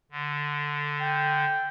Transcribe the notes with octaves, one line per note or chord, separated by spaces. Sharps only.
D3
G5